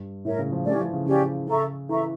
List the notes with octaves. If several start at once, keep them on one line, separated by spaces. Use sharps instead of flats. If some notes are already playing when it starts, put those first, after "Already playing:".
Already playing: G2
A2 A#4 C#5 E5
C#3
F3
A3 C#4 G4 D5
E3
F3
C#3
C#3 C#4 G4 D5
C#3 A4 E5 A#5 C#6
E3 A4 E5 A#5 C#6